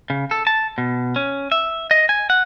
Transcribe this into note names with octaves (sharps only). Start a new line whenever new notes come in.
C#3
A4
A5
B2
C#4
E5
D#5
G#5
F#5